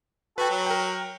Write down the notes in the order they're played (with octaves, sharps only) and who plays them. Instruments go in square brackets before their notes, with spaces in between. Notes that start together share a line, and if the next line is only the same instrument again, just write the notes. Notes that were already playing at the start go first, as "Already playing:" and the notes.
[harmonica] F#4 A4 [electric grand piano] B4 G5
[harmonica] F#3
[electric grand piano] A#4 G5